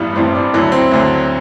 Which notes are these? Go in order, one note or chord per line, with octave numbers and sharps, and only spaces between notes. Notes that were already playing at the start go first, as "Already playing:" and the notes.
Already playing: A1 G2 E3 G3 B3
A1 G2 E3 G3 C4
D4
D2 D3 F#3 E4
C4
D2 D3 F#3